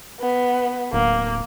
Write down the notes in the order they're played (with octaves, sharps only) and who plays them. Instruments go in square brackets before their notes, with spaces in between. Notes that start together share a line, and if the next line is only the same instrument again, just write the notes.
[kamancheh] B3
[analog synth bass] D1 [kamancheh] A#3